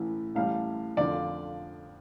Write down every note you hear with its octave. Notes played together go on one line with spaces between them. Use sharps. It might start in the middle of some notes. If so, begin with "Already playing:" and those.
Already playing: A1 A2 E3
A1 A2 G3 F5
F2 D3 F3 D5